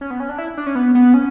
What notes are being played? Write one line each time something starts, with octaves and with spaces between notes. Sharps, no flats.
C#4
B3
C#4
D4
E4
D4
C#4
B3
B3
C#4